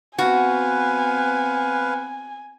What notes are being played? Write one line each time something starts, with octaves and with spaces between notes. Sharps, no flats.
B3 C4 F#4 B4 F5 G#5